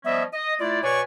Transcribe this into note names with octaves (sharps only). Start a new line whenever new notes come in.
F3 G3 B3 C#4 D#5 E5
D#5
A3 E4 F4 D5
B2 B4 C#5 D5 G#5 C#6